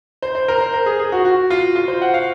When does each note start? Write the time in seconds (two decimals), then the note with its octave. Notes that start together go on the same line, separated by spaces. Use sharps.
0.22 C5
0.35 C5
0.48 A#4
0.61 C5
0.74 A#4
0.86 G#4
1.00 G#4
1.12 F#4
1.25 F#4
1.50 F4
1.75 F4
1.88 C5
2.02 F#5
2.14 F5